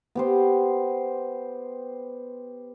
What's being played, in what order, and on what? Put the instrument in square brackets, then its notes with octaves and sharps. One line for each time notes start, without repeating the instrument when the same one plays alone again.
[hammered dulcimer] B3 G4 C5